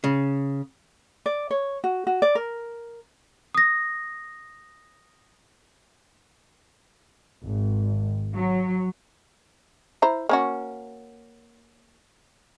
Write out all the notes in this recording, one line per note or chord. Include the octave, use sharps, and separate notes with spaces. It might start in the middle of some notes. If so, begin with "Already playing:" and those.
C#3
D5
C#5
F#4
F#4
D5
A#4
D#6 A#6
G#1
F#3
E4 C5 A#5
A#3 C#4 F#4